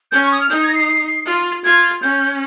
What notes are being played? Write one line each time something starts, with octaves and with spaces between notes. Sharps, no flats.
C#4 G6
C#6
D#6
F6
D#4 G6
G#6
A#6
C7
C7
C7
F4
F4 G#6
C#4 G6